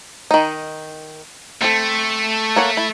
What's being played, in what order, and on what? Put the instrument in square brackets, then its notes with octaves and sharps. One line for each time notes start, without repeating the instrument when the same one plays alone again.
[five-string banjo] D#3 D#4
[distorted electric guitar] A3 [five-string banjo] C4 A4
[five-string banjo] A#3 C#5 F#5
E4